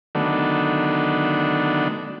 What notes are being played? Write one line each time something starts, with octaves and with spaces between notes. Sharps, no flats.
D3 D#3 F#3 A3 B3 D4